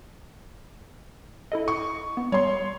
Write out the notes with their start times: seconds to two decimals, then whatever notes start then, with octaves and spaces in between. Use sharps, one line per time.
1.52 E4 A4 D#5
1.68 C#6
2.17 B3
2.32 G3 C#5 C6